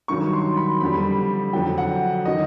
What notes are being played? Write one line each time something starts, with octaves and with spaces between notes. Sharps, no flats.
G2 D#3 F#3 C#6
C6
B5
F2 D3 G3 B5
F2 D3 F#3 G5
F#5
D#3 F#3 D#5